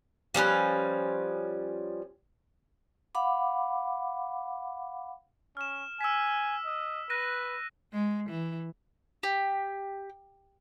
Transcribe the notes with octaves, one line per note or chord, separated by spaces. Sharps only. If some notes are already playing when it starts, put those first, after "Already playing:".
F3 G3 C#4 B4
F5 F#5 B5 D6
C#4 F6 E7
G#5 E6 B6
D#5
B4 F#6 A#6 D#7
G#3
E3
G4